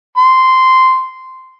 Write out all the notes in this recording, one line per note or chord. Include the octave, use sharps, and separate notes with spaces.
C6